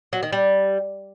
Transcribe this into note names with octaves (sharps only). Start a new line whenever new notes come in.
F#3
D#3
G3